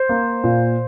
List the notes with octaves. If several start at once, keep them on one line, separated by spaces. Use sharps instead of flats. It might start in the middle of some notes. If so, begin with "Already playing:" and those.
Already playing: C5
A#3
A#2